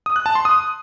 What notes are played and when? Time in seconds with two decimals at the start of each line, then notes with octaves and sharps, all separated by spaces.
0.06 D#6
0.16 F#6
0.26 A5
0.35 C6
0.45 D#6